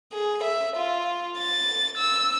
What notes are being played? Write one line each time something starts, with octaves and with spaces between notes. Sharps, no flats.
G#4
E5
F4
A6
E6